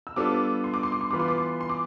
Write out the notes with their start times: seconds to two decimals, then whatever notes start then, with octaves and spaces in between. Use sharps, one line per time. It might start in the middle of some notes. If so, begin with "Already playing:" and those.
0.07 E6
0.16 G3 B3 D4 F4 A4 D6
0.64 C6
0.74 D6
0.83 C6
0.92 D6
1.01 C6
1.11 E3 B3 F4 B4 D6
1.20 C6
1.28 D6
1.38 C6
1.61 C6
1.69 D6